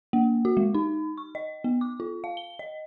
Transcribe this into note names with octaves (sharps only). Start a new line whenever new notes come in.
A#3
F#4
G#3
D#4
C#6
D#5
B3
D6
F4
F5
G7
D#5